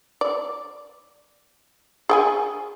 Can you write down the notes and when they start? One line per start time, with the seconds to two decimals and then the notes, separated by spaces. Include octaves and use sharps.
0.21 D5
2.09 G#4 G5 G#5